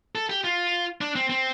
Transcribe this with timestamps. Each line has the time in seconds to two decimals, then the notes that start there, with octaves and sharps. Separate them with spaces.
0.15 A4
0.30 G4
0.44 F4
1.01 D4
1.16 C4
1.30 C4